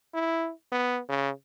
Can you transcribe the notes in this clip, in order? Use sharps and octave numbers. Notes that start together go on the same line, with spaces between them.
E4
B3
C#3